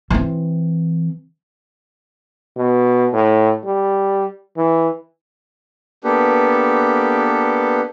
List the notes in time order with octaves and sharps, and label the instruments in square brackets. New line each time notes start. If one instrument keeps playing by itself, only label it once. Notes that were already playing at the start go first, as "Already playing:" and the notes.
[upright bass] E3 C4
[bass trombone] B2
A2
G3
E3
[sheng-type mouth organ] A#3 B3 D4 G4 A4 B4